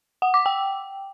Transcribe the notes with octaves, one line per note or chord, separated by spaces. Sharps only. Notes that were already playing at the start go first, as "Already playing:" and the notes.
F#5
D6
G5